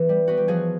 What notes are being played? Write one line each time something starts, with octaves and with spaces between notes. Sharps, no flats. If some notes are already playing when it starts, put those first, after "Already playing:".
Already playing: E3 B3 G4
G3
B3 F#4
G4
F3 F#4 G#4